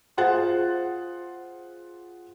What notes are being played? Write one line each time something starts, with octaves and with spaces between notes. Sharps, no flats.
F4 G#4 C5 F#5 A6